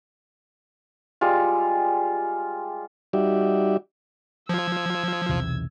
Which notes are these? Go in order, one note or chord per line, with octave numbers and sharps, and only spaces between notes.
G3 G#3 F4
G3 D#4 F#4 G4 D5 E5
F3 E6 G#6
B1 E2 C3